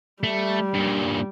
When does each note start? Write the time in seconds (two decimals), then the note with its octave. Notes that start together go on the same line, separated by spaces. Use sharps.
0.23 G3 A3
0.74 G2 A#2